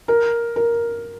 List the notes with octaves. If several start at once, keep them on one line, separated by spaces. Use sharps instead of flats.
A#4
A#4